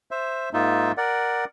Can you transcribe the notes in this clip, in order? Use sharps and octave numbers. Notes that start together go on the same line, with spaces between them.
C5 E5
G#2 A#3 D#4 F4 E5
A#4 D5 F#5